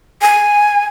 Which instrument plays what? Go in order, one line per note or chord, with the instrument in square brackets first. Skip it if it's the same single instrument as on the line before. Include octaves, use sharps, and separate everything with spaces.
[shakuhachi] G#5